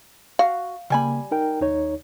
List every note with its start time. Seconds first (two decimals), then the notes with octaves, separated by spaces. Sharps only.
0.39 F#4 F5
0.90 C#3 G3 A#3 G#5 B5
1.31 D#4 A#4 G5
1.61 D#2 D#4 C#5